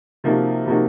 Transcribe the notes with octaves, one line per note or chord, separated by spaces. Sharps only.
C3 F3 A#3 D#4 F#4
C3 F3 A#3 D#4 F#4